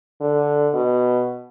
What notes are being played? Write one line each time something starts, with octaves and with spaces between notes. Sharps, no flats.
D3
B2